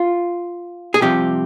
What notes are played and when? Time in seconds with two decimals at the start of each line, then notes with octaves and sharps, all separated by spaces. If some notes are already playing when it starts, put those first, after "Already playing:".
Already playing: F4
0.94 G#4
1.01 C2 C3 F3 G4